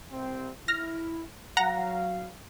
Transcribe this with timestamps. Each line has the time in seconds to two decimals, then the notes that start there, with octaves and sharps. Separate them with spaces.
0.11 C2 C3 C4
0.68 E4 F6 A#6
1.57 F#3 F5 F#5 A#5 A#6